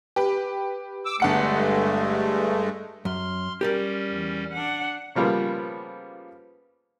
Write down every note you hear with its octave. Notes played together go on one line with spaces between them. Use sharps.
G4 B4
D6 E6
G1 G2 G#3 A3 F#5 C#7
F#2 C6 F6
G3 C#4 G4 A#4 D5
E2
D4 F#5
C#3 F3 G3 A#3 B3